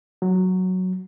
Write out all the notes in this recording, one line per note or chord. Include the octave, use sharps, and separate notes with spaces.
F#3